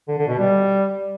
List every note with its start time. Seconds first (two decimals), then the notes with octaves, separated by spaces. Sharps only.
0.08 D3
0.18 D3
0.28 B2
0.38 G3